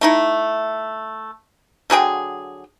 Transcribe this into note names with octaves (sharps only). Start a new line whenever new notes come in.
A3 D#4 E4
D3 F#3 G#4 G5